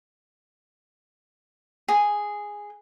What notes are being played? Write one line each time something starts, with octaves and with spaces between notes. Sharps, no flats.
G#4